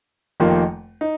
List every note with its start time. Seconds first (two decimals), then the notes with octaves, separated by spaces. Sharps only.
0.40 F1 F2 D#3 A#3 F4
1.01 D#4